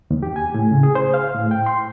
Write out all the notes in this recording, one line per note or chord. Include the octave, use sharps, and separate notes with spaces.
D#2
G4
G#5
A2
C#3
G#4
C5
F5
A2
G5
C6